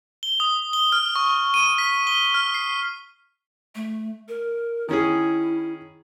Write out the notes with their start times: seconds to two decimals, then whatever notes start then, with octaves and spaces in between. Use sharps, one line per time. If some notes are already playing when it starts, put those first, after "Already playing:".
0.23 G7
0.40 D#6
0.73 G7
0.92 F6
1.16 C#6
1.54 D#7
1.78 B6
2.07 G7
2.34 F6
2.54 C7
3.75 A3
4.28 A#4
4.89 D#3 C#4 E4 G#4